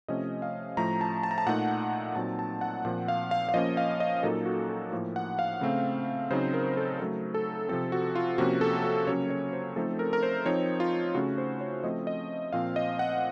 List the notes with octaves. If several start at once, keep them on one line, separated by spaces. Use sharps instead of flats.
C3 F3 A3 C#4 D#5
F5
A2 F3 A3 A#5
A5
A5
A#5
A5
A#2 A3 D#4 F#5
A#2 F#3 C4 D#4 A5
A5
F#5
A#2 F3 C4 F#5
F5
F5
F5
F3 A#3 C#4 D#5
F5
D#5
A#2 F#3 A#3 D#4 A4
F#4
A4
A2 F3 A#3
F#5
F5
C#3 A3 C4
C#3 F#3 C4 D#4 C5
A#4
A4
C#3 F#3 A3
A4
C3 F3 C4 A4
F#4
F4
C3 F3 A#3 C#4 F#4
A4
F#4
C#3 F#3 A#3 C#4 C#5
C#5
C5
F3 A3 C4 D#4 A4
A#4
A#4
C5
F3 C4 D#4 C#5
F4
C#3 A3 C#4 F#4
C5
C#5
F3 A3 C4 D#5
D#5
A#2 F3 C4 F5
D#5
F#5